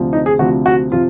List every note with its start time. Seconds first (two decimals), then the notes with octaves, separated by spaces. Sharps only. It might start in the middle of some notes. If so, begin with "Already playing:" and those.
Already playing: D2 C3 F3
0.13 D#4
0.26 G#4
0.39 D2 C3 F3 F#4
0.66 F#4
0.92 C3 F3 F4